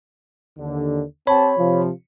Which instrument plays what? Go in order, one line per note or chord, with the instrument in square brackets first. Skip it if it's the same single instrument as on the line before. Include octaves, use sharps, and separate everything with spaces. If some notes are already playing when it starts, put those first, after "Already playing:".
[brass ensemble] D#2 D3
[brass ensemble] C4 G4 A5 [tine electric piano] C#5 B5
[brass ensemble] C3 F3